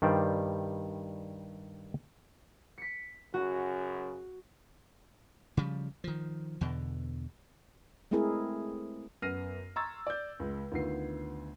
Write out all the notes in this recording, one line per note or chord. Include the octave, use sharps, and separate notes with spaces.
G2 D#3 G3 C5 D5 G5
B6 C#7
F#2 C#3 F#4
C#3 F3 G3
D#3 F3
E2 B2 D3
G#3 A3 C4 E4 G#4 A#4
F#2 B3 F6 A#6 C7 D#7
A#5 C6 C#6 E6 G#6 A6
D5 G6
C#2 G#3
D2 D#3 B3 F4 C7